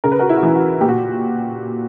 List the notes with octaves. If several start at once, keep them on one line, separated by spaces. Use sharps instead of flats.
C#3 A#4
B4
F#4 A#4
E4
F#4
E3 E4
F#4
A#2 G4
F#4